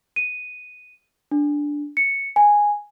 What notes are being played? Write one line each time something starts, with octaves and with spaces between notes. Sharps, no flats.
D#7
D4
C#7
G#5